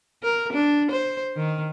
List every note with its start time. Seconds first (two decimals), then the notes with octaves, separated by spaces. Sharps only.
0.23 A#4
0.53 D4
0.91 C5
1.36 D#3